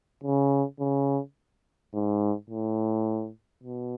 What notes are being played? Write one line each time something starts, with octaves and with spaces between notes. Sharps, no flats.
C#3
C#3
G#2
A2
B2